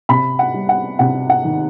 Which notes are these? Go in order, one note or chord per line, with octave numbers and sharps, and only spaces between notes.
C3 B5
F#5
G3
F#5
C3 F#5
F#5
D#3